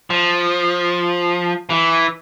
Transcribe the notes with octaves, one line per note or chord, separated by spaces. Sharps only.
F3
E3